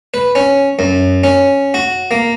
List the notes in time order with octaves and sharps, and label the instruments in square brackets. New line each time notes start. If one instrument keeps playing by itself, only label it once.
[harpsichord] B4
C#4
F#2
C#4
F#4
A#3